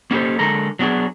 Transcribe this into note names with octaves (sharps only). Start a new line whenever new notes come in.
A#3 C#4 D#4 G4 A4 C5
D3 G#3 A4 A#4 A#5
F#3 B3 D4 F#4 G#4